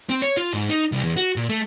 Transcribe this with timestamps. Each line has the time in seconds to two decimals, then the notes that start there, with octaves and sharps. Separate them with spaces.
0.09 C4
0.22 C#5
0.37 F4
0.53 G#2
0.69 D#4
0.92 C2
1.04 E2
1.17 F#4
1.36 A#2
1.49 A3